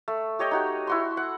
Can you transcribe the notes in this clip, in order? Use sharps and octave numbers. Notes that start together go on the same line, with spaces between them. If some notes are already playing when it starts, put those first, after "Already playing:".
A3
G4 C#5 D#5 G5
D#4 F#4 G4
E4 F#4 C6
F#5